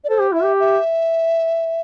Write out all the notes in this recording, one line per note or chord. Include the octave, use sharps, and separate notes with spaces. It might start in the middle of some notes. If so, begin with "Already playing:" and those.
D5
A4 C5
G4
E4 E5
G4
E5